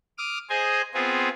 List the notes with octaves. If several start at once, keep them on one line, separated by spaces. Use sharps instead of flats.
D6 D#6 F6
G#4 C5 D#5 G#5
B3 C4 F4 G#4